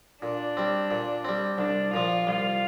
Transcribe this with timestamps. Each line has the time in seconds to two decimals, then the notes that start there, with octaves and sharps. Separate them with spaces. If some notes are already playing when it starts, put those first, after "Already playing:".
0.22 A#2 D4
0.57 G3 C4
0.91 A#2
1.25 G3 C4
1.58 C2 D4
1.93 A#2 F3 F4
2.27 C2 F4